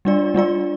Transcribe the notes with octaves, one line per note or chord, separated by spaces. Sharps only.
G3 D4 F4 D5
G3 D4 F4 D5